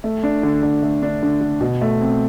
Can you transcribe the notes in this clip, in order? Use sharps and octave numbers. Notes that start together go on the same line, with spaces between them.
A3
D4
D3
D3
A3
D4
D3
D3
B2
A3
C4